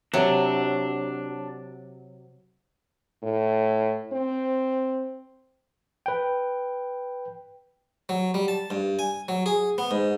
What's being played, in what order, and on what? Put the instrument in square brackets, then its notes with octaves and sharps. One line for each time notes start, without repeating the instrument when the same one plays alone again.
[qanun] C3 [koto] F#3 [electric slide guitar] D4
[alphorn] A2
C4
[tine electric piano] B4 G5
[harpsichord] F#3
G3
A5
G2
G#5
F#3
G#4
B3
G#2